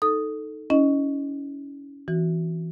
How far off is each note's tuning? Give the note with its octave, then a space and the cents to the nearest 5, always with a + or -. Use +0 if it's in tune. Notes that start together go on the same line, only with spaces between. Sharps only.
D#4 +0 A4 +0 D#6 +0
C#4 +20 E4 -30 D#5 +0
E3 +0 C4 +0 F#4 -5